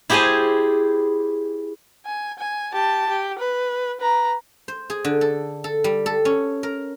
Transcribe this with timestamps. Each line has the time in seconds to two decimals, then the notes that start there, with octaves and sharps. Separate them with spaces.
0.10 E4 G4 G#4 C5 G#5 A5
2.06 G#5
2.38 G#5
2.73 G4 A5
3.09 G4
3.38 B4
4.00 B4 A#5
4.68 C5
4.90 G#4
5.05 D3
5.21 A4
5.64 A4
5.84 G3
6.06 A4
6.25 C#4
6.63 A#4